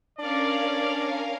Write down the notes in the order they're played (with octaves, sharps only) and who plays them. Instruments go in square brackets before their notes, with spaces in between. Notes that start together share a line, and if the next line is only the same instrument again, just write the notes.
[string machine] C#4 A#4 F5 [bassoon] D4 [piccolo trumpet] D5